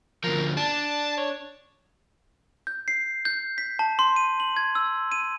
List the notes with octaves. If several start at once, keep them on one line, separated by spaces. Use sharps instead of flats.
D2 F3 A#4
D4 A5
C#5
G6
C7
G6
B6
A5
C6
D#7
F#7
G#6
E6
D#7